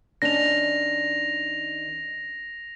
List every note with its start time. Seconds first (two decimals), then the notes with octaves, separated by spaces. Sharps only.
0.22 D#3 C#4 D4 A#6 F7